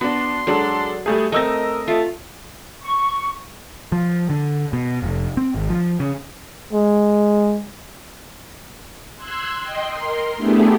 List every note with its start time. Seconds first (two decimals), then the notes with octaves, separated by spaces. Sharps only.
0.01 B3 D4 F#4 C6
0.47 F#3 G#3 D4 A4
1.06 G3 A3 G#4
1.32 A3 C4 A#4 D#5 E6 A#6
1.88 A3 F4
2.83 C#6
3.92 F3
4.30 D3
4.73 B2
5.02 F1
5.37 C4
5.55 G#1
5.70 F3
6.00 C#3
6.73 G#3
9.16 C6 E6 F#6 G#6
9.62 D#5 G5 C6
9.92 A#4 C6
10.36 A3 B3 D4 E4 G4 G#4